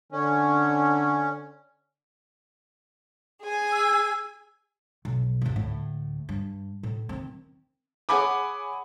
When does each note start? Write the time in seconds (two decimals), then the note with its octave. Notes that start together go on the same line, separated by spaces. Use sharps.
0.12 D3 C#4
3.41 G#4 G#5
3.72 E6
5.05 B1
5.42 G#1 E2
5.56 D2 A2
6.29 G2
6.83 A2
7.09 D#3 C4
8.09 G#4 C#5 F#5 G#5 B5 D6